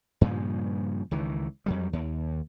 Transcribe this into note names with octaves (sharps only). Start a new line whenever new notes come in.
G2 A#2 C#3 F3
C#2 D#3 E3
F2 F#3 G3
D#2